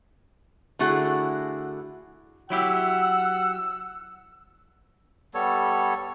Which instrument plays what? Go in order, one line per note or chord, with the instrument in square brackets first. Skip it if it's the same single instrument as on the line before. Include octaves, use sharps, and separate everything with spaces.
[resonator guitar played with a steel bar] D3 A3 E4 F#4 G#4
[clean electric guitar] F#3 E4 G4 [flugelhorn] F#5 [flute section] E6
[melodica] G3 B3 A4 C#5